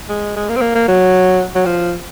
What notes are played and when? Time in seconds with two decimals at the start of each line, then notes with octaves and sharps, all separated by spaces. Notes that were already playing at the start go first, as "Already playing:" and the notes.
0.09 G#3
0.37 G#3
0.49 A#3
0.56 C4
0.61 A#3
0.75 A#3
0.88 F#3
1.55 F#3
1.66 F3